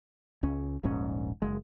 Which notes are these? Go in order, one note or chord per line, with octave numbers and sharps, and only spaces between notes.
C#2 C#4
D#1 A#1 G#2 C#4
F#1 G#3